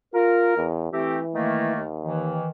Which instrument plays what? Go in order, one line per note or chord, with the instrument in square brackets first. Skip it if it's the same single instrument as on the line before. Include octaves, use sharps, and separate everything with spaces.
[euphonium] F4 [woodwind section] A#4
[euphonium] E2
[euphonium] E3 [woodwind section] A3 C4 G4
[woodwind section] D#3 A3 A#3
[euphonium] D#2
[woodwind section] D#3 E3